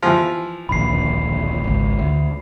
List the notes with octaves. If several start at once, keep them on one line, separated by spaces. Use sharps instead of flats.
E3 F3
D1 A#1 D#2 B5 C7
G#1 C#2
D2